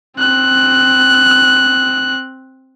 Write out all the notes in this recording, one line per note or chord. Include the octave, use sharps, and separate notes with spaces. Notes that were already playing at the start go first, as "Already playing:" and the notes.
C4 F#6